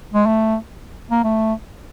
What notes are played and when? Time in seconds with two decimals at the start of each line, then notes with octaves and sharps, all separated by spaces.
0.14 G#3
0.26 A3
1.11 A#3
1.24 A3